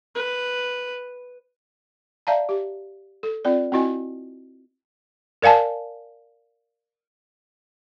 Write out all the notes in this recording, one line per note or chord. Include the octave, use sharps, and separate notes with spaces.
B4
D5 E5 F5 A5 A#5
G4
A4
C4 F4 D5
C4 E4 F#4 D#5 G#5
A#4 D5 F5 G#5 A5